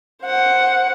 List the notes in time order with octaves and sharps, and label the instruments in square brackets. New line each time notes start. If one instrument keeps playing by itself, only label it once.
[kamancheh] C5 F#5